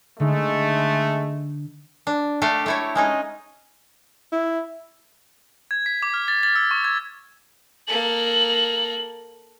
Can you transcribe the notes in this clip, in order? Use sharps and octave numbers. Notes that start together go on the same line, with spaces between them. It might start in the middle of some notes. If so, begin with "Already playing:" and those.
D3 G#3 A3 D#4
D4
A3 D4 G4 F5
A3 E4 C#5
G#3 C#4 D#4
E4
G#6
B6
D6
F6
A6
A6
E6
C#6
G#6
A#3 A4 F#7